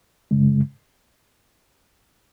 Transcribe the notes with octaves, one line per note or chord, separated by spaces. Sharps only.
F#2 C#3 G#3